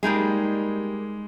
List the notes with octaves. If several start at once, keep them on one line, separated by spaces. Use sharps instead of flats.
G3 G#3 A#3 D#4 G#4